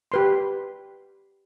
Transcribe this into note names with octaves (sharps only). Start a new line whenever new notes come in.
G4 B4 C6